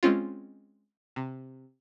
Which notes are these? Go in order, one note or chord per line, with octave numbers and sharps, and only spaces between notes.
G#3 C4 C#4 F4
C3